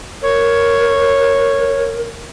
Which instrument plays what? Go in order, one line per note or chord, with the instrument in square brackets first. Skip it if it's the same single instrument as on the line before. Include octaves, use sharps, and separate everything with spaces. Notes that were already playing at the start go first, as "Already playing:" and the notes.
[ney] A#4 [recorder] C#5